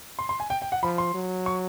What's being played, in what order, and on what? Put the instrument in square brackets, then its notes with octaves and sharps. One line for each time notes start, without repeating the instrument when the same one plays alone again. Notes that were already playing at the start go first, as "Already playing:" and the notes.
[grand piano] C6
C6
G#5
G5
G5
F#5
[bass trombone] F3 [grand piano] B5
[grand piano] C6
[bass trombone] F#3
[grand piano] C#6